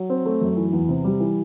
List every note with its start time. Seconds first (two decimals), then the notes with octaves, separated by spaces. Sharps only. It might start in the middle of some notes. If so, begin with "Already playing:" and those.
Already playing: F#3
0.10 C4
0.26 A3
0.41 F#2
0.57 E3
0.73 E2
0.89 C3
1.04 G3
1.20 E3